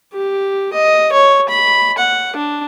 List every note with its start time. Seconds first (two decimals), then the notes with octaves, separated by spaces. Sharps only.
0.13 G4
0.73 D#5
1.12 C#5
1.49 B5
1.98 F#5
2.36 D4